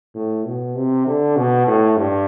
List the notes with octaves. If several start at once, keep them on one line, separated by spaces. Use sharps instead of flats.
A2
B2
C3
D3
B2
A2
G2